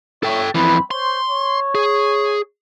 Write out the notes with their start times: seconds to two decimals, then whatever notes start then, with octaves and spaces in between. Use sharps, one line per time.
0.23 A4 C#5 E5 G5
0.55 F2 E3 C4 B5
0.91 C5 C#5 C6
1.28 C#5
1.75 G#4